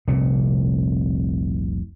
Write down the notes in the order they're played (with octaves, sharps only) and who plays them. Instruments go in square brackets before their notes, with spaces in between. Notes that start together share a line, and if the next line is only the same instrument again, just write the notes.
[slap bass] F1 C2 A#2